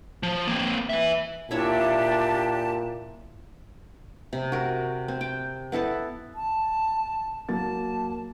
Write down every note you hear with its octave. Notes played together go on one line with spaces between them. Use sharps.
F3
A#3 C4
B4 E5
A#2 D4 E4 G4 C#5 E5 A5
C3
F#4 A#4
C4
G5
B3 E4 A4 A5
A5
F#3 A#3 A5 A6